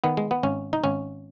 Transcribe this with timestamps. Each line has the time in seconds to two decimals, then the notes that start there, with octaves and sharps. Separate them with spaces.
0.04 D#3 B3
0.17 G#3
0.31 B3
0.43 G#1 C#4
0.73 D#4
0.84 G#1 C#4